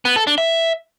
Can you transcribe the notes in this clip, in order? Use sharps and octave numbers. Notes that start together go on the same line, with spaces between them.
B3
A4
D4
E5